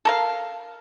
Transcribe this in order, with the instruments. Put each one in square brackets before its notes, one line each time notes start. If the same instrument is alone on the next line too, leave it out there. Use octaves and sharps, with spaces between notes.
[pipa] A4 A#4 F5